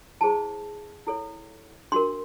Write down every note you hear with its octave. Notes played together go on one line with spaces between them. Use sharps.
E4 G#4 C5 A5
E4 A4 C#5
D4 F#4 A#4 C6